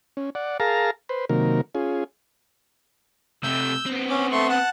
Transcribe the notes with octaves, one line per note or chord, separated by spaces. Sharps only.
C#4
D5 F#5
G#4 A#4 F5 A5 A#5
B4 C5
C3 D#3 F#3 A#3 A#4
C#4 F4 G#4
C3 A3 E6 G6
B3 C4
C#4 D6
A3 C6 C#6
F#5 A5